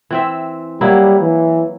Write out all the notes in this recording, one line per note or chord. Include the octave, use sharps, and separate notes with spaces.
E3 C4 E5
F#3 G3 A#3 E4
E3